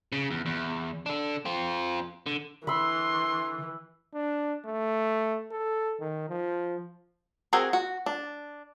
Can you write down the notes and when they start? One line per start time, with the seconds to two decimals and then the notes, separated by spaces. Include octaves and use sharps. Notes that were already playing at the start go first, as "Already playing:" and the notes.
0.12 C#3
0.31 E2
0.46 E2
1.06 D4 A4
1.45 C4 F4
2.26 D3
2.67 D3 E3 B5 C6 E6
4.14 D4
4.66 A3
5.52 A4
6.00 D#3
6.29 F3
7.53 C4 F#4 G#4 A#4
7.73 F#4
8.06 D4